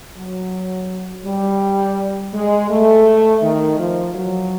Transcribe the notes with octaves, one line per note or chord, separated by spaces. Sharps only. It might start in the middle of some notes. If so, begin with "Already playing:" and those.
F#3
G3
G#3
A3
D#3
F3
F#3